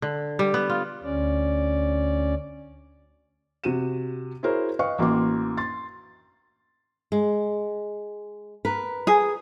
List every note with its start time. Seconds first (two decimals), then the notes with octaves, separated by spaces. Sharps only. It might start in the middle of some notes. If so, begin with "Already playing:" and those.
0.02 D3
0.39 G3
0.54 B3
0.70 F4
1.03 D2 C#4 D5
3.64 C3 F#4 D#7 E7
4.43 E4 F#4 G#4 A#4 C5 C#5
4.79 B4 D#5 F5 G5 C#6
4.99 A1 A#3 F#4 G5 C6 D6
5.58 C6 A6
7.12 G#3
8.65 A#4 B4
9.07 G#4